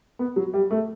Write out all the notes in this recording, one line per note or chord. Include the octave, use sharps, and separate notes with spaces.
B3
F#3
G3
A3